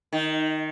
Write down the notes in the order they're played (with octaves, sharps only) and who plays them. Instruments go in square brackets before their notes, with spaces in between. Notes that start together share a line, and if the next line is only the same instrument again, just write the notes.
[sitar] D#3